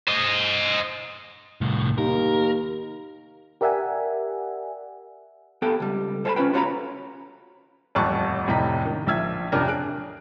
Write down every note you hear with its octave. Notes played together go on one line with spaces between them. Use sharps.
C5 D#5
C2 A2
D#2 A#4
G4 A#4 D5 E5 F#5 G#5
B3 G4 A4 F5 G5
C#2 G3
A4 C5 E5 G#5 A5 B5
C#4 F4 B4 G5
F4 F#4 C#5 F5 A#5 B5
D#1 A1 F2 A5 C#6 F#6
F1 A2 C3 D#5 A#5 B6
D#3
A#1 F3 E5 E6 G#6
A1 F2 C3 D4 A#4
G#4 F#6 D7